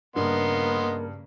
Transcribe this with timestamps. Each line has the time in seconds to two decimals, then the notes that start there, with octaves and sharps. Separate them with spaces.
0.16 G2 C#3 A#3 B3 A#4 D#5 C6